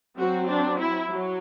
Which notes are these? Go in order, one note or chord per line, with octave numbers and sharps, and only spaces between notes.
F#3 C4 F#4
D4
E4
F#3